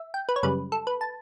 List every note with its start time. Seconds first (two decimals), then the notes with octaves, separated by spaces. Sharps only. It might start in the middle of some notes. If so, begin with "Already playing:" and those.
Already playing: E5
0.14 G5
0.29 B4
0.36 C#5
0.43 F#2 C#3 G3 B4
0.72 A4
0.87 B4
1.01 A5